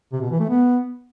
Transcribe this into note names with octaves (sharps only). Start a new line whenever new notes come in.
C3
B2
E3
A3
B3